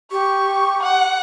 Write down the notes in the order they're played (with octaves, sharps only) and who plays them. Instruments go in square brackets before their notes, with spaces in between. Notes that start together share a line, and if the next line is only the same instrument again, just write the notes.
[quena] G4 [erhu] C#6
[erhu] F#5